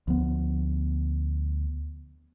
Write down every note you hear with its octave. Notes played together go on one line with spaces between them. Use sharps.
D2 F3 B3